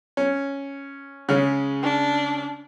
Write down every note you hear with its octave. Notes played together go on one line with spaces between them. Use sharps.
C#4
C#3 G#3 C#4
D4